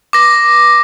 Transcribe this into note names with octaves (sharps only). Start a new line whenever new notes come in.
D6 A#6